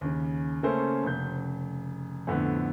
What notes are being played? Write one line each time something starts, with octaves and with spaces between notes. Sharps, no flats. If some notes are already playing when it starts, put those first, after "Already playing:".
D#2 C#3
C#3 A3 A#3 C#4 A4 C5
F1 C#3 G6
F2 A2 D3 B3